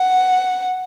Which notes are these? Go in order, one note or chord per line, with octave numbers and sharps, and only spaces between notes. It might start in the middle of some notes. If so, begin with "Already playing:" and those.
Already playing: F#5